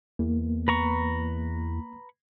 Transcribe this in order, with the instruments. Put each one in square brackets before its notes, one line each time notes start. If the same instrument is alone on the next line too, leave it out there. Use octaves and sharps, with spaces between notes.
[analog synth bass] E2 [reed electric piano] A#3
[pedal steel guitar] B4 A#5 C#6